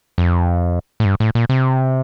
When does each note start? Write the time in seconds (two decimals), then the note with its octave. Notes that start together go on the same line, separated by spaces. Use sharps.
0.18 F2
1.00 A2
1.05 G2
1.20 A2
1.35 A#2
1.49 C3